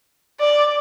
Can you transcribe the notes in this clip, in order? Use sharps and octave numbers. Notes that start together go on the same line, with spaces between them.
D5